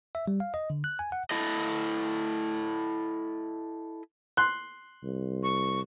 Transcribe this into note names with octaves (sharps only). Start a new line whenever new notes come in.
E5
G3
F5
D#5
D3
F#6
G#5
F#5
E4 A4 D#5
C6 F#6
C2
C#6